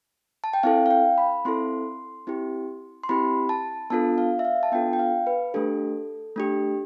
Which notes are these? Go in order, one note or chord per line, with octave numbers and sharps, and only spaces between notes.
A5
G5
C4 E4 A4 F5
F5
G5
B5
C4 E4 A4 C6
C4 E4 G4
C6
C4 E4 G4 B5
A5
B3 D4 F4 A4 A5
F5
E5
F5
A5
B3 D4 F4 A4 G5
G5
F5
B4
A3 D4 G4 A4
A3 D4 G4